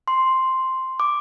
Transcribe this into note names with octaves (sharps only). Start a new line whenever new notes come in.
C6
D6